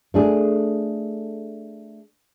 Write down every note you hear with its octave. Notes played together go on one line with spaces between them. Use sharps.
A3 D4 G#4